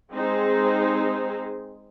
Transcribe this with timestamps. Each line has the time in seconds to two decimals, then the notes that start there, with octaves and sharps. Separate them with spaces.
0.14 G#3 C4 D#4 G#4 C5